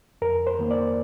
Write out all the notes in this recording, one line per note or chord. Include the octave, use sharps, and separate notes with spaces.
F2 A#4
C5
D#3 A#3
D5